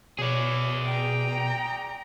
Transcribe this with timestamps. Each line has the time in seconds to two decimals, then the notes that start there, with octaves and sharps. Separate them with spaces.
0.18 B2 G#4 C#5 D5
0.85 G5 A#5